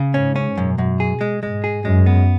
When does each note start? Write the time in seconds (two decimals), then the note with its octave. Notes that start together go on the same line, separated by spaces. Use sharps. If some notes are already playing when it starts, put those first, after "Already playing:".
Already playing: C#3
0.14 G#2 C#4
0.36 C#4
0.58 F#2 B2
0.78 F#2
1.00 G#4
1.21 G#3
1.43 G#2 G#3
1.64 G#4
1.85 F#2 G#3
2.06 B3